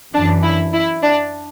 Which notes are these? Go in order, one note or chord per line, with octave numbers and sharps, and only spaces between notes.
F#2 E3 D4
E4
E4
D4